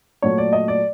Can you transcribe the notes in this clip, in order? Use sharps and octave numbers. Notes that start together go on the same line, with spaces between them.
A#2 F#3 A3 C#5
D5
D#5
D5